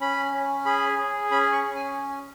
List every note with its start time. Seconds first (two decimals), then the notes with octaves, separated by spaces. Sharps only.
0.01 C#4 B5
0.33 C#4
0.65 G#4 B5
0.98 G#4
1.31 C#4 B5
1.52 C#6
1.64 C#4
1.75 G#5